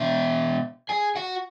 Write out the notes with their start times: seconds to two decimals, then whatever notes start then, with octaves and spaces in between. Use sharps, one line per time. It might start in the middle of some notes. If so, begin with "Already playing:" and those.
Already playing: B2 B3 E5
0.89 G#4 G#5
1.16 F#4 F#5